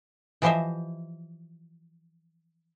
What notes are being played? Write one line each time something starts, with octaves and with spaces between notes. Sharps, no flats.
E3 F3 G4 C5 D#5 E5